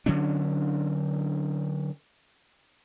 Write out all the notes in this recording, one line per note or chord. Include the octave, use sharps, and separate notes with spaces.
D3 F#3 C#4 D4